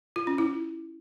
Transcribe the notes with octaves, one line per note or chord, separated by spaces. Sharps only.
F4
C#4
E4